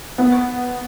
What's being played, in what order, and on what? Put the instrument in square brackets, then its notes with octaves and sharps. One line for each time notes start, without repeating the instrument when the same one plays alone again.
[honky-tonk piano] B3